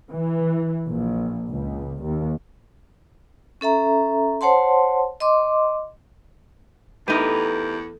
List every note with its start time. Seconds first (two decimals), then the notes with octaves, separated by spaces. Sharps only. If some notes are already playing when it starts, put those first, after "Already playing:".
0.10 E3
0.87 A#1
1.49 C#2
2.02 D#2
3.61 C#4 A4 E5 A#5
4.41 C5 C#5 F#5 A5 C6
5.20 D#5 C6 D6
7.08 E2 A3 D#4 G4 A#4 B4